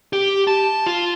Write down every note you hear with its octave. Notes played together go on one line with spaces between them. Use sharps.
G4
A5
F4